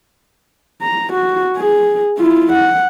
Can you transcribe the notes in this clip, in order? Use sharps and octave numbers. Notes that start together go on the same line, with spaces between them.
A#5
F#4
G#4
E4 F4
F#5